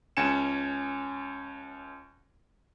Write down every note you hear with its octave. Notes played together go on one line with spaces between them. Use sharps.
C#2 C#4 G#5 C#7 E7